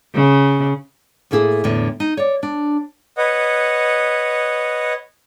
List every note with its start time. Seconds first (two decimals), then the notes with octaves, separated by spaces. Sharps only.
0.14 C#3
1.31 A2 A3 A#3 E4 G#4
1.64 E2 A2 D3 E3
2.00 D#4
2.17 C#5 D5
2.43 D4
3.16 B4 C#5 D#5 F#5